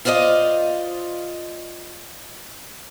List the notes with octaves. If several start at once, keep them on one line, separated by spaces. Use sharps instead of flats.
F4 C5 D5 D#5 F5